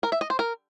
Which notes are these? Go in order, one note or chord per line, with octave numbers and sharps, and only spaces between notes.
A#4
E5
D#5
C5
A#4